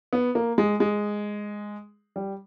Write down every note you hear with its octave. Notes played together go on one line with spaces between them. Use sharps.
B3
A#3
G#3
G#3
G3